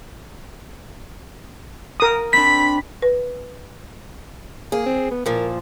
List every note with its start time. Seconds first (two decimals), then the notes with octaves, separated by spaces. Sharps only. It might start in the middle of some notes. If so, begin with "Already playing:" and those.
2.00 A#4 D#6
2.33 C4 D4 B5 B6
3.02 B4
4.72 A#3 G#4
4.86 C4
5.11 B3
5.26 A#2 F3 A#4